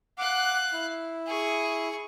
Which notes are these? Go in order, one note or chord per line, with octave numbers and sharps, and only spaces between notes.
F5 F#5 D6 F#6
E4
G#4 C#6